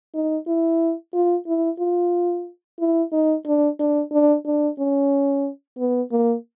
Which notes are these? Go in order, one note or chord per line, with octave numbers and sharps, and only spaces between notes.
D#4
E4
F4
E4
F4
E4
D#4
D4
D4
D4
D4
C#4
B3
A#3